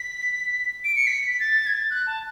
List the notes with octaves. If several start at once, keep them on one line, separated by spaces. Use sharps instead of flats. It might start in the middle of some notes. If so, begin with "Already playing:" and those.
Already playing: B6
D7
C#7
B6
B6
A6
G#6
A6
F#6
A5